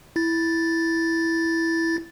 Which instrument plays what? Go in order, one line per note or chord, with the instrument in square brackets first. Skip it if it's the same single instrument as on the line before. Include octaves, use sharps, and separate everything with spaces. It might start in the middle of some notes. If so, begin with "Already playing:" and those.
[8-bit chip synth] E4 A6